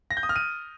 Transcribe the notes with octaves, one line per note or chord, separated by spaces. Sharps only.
A#6
G6
D#6
F6
D#7